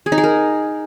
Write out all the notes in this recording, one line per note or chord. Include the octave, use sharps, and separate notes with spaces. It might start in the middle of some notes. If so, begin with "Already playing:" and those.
G#4
D#4
G#4
A#4